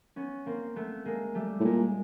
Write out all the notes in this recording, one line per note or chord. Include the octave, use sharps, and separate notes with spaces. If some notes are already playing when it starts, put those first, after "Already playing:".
B3 C#4
A#3 C4
A3 B3
G#3 A#3
G3 A3
A2
A#2 G#3